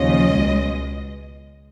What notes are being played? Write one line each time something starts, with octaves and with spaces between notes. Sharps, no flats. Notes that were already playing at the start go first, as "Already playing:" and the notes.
Already playing: D#2 C#3 F3 C#4 D#5
C#2 B2 G#3